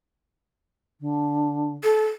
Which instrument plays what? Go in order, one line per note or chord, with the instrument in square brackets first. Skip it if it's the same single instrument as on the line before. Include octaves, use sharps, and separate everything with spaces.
[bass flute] D3
[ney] A4